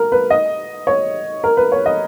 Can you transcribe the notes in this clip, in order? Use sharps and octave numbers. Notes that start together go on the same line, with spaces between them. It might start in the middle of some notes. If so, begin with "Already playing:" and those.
Already playing: A#4
B4
D#5
C#5
A#4
B4
C#5
D#5